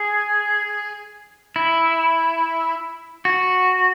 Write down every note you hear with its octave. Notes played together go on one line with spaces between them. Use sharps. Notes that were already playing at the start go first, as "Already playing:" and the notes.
Already playing: G#4
E4
F#4